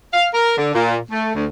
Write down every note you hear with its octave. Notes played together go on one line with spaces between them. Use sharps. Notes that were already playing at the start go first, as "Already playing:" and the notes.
F5
A#4
D3
A#2
A3
D2